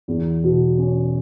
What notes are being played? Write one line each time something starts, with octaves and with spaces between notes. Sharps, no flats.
E2
B2
C#4